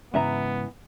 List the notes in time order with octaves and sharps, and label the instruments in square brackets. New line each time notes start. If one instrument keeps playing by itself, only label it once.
[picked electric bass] G#2 C#3 G#3 [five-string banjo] E3 E5 A#5 [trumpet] B3